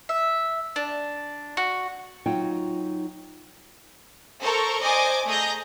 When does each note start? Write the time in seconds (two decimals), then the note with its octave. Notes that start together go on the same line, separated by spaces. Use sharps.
0.09 E5
0.76 D4
1.57 F#4
2.26 F#3 D#4 F4 G5
4.42 A4 A#4 C5 A#5 C#6
4.81 C5 D5 D#5 G#5 D6
5.27 A3 G#4 D#5 A#5 G6 A#6